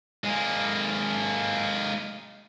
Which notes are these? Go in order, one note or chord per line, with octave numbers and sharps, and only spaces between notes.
G#3 A#3